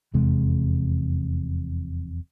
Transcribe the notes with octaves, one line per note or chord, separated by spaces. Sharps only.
F1 E2 C3 G#3